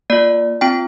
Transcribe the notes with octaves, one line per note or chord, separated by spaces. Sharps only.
A#3 F4 D5
C4 F4 G5